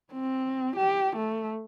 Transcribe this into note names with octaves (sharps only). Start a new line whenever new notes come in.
C4
G4
A3